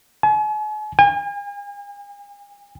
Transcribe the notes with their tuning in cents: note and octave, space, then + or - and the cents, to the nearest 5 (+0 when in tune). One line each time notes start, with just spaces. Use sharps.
G#5 +40
G#5 -45